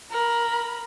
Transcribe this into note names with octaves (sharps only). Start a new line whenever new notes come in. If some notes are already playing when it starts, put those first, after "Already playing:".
A#4 B5